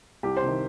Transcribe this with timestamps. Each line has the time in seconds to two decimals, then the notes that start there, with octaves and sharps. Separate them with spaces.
0.23 C2 G4
0.37 C5
0.43 C3 D#3